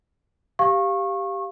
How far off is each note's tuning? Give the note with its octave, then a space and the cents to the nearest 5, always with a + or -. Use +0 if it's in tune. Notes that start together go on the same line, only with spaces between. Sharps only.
G4 +0 F5 +0 C#6 -25